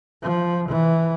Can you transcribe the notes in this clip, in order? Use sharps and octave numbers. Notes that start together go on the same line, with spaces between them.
F3
E3